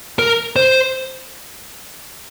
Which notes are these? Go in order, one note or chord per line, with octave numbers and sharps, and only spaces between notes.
A#4
C5